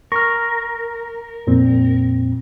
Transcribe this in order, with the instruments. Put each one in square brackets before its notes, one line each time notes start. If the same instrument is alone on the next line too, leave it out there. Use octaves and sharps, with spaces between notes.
[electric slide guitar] A#4 [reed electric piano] C#6 F6
[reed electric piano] F2 A#2 C4